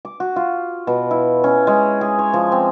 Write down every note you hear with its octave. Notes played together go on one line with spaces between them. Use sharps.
D6
F#4
F4
B2
E4
C#4
G#3
G#4
C#5
F3
C4